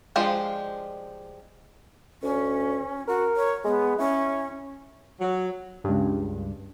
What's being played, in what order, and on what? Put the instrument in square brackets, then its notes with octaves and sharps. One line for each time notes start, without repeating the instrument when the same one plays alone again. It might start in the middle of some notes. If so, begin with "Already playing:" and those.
[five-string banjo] F3 G#3 D4 G4 C5
[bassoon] D2 [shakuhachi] C#4
[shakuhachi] F#4 [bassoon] A#4
[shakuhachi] C#5
[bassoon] G#3 [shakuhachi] B3
[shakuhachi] C#4 [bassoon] E4
[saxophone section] F#3
[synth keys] C#2 G2